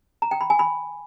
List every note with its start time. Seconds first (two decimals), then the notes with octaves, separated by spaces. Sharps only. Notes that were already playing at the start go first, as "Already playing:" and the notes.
0.22 A#5
0.31 G5
0.41 B5
0.50 G#5
0.59 B5